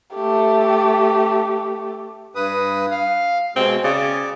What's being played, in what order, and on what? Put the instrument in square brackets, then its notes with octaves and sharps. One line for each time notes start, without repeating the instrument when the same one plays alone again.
[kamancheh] A3 G4
[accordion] G2 B4 D#6
F5
[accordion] B2 G#3 [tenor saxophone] C4
[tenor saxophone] C#3 [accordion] D5